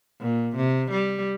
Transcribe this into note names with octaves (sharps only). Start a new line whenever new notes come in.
A#2
C3
G3